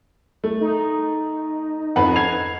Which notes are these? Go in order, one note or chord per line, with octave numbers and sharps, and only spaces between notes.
A3
D#4
F2 B4 F#5
G#6 C7 F7